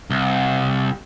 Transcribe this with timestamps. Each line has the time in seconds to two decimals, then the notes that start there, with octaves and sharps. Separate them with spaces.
0.11 C2